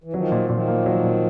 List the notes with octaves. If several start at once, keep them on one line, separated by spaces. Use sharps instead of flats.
E3
D#3 F3 F#3
A#2
A#2 D#3 F3
A#3
F#3
A#2